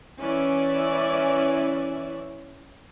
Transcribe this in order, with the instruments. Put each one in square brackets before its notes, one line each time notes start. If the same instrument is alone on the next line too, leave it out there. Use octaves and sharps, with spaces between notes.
[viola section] E3 C#4 D5 E5